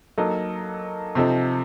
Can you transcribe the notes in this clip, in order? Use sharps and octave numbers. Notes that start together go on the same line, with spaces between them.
F#3 A#3 D#4 A4
C3 F3 C4 D#4 A4